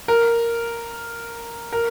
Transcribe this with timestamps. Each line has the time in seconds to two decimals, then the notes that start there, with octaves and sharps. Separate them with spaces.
0.08 A#4
1.73 A#4